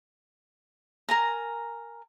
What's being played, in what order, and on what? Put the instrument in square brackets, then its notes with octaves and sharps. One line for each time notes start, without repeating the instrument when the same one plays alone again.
[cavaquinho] A#4 G#5 A#5